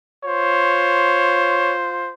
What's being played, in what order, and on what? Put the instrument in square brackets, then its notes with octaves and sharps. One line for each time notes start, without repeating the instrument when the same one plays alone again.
[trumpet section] F4 C5 [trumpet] C#5